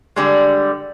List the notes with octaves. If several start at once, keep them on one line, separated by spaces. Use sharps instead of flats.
D3 G3 G#3